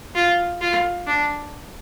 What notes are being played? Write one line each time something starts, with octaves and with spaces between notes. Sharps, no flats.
F4
F4
D4